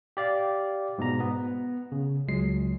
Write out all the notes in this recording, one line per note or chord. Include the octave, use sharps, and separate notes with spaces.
G4 D5 F5
G#2 B2 G#3 A#5
B3
C#3
C#2 F#3 G#3 C7